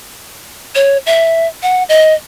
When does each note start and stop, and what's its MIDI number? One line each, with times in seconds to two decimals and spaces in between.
0.75 0.98 73
1.06 1.47 76
1.63 1.83 78
1.89 2.13 75